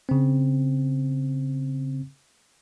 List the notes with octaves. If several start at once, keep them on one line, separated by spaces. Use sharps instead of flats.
C#3 C4